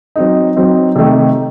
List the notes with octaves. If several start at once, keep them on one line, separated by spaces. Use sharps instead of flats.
F#3 C4 D#4
F#3 C4 D#4
C3 D#3 A3 D#4